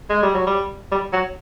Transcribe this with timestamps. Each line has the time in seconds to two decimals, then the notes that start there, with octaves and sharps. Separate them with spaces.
0.10 G#3
0.23 G3
0.35 F#3
0.46 G3
0.92 G3
1.13 F#3